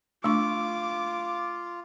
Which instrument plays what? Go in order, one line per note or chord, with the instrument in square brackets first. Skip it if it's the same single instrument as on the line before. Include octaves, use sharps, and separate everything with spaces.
[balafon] A3 D4 C#6 [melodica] F4 [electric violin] D6